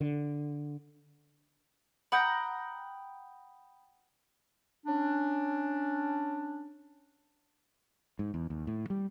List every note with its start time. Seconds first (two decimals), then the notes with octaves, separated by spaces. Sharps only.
0.01 D3
2.12 F#5 G5 A#5 B5 D#6 G6
4.86 C#4 D4
8.19 G#2
8.34 E2
8.50 D#2
8.67 A2
8.90 G3